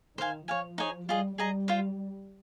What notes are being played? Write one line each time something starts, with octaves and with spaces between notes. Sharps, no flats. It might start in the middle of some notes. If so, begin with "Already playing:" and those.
D#3 C5 F5 G#5
F3 C#5 F5 G#5
D#4 G#4 C#5 G#5
G3 F4 G#4 D#5
G3 G#4 D#5 A#5
F4 C5 F5